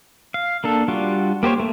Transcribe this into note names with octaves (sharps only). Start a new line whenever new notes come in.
F5
A#3 D4 A4
G3 D4 F4 F#4
A#3 G4 C5 C#5
A3 A#3